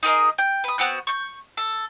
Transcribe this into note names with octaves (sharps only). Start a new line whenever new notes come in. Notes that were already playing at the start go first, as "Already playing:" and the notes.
D#4 G#4 A#4 D#5
G5
B4 D#6
B3 C4 F#4 F#6
C#6 G6
A4